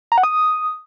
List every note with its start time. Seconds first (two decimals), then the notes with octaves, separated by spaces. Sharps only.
0.12 A#5
0.18 F#5
0.23 D#6